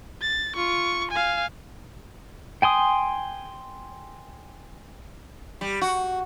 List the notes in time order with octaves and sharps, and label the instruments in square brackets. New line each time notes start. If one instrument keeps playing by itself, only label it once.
[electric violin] A6
F4 C#6
F5 G#5
[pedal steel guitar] G5 G#5 C6 D#6
[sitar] G3
F#4